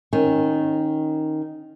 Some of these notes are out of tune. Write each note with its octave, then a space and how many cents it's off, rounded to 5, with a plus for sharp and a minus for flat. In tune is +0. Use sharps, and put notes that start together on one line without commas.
D#3 +0 C#4 -25